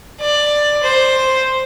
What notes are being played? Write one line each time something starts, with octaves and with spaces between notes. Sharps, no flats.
D5
C5